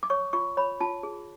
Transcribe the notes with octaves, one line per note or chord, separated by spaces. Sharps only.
D6
C#5 C#6
F4 C#6
C#5 B5
F4 A5
G#4